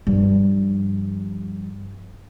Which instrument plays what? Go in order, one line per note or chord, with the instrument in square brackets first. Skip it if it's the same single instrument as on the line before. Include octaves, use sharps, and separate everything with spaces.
[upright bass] G2 F3